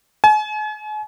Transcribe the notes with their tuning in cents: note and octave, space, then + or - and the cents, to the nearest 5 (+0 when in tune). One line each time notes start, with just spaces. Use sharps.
G#5 +40